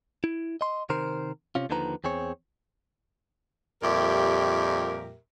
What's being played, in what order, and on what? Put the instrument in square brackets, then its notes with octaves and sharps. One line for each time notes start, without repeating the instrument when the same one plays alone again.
[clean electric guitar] E4
D#5 C6
C3 D#3 A#4 C5
C3 C#4 F4
D#2 D3 D#3 F3 B4 A#5
E2 C4 G#4 C#5
[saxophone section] F2 A#2 G3 G4 A#4 E5